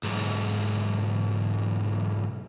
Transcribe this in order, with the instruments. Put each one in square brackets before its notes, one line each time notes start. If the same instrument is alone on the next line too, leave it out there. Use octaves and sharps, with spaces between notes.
[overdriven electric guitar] B1 G#2